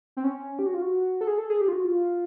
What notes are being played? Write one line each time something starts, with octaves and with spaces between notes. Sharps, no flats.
C4
C#4
G4
F#4
F4
F#4
A4
G#4
A4
G#4
G4
F4
F#4
F4